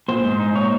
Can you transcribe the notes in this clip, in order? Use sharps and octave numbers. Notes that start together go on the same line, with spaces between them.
A#2 C5
G#2
D#4
A#2 C#5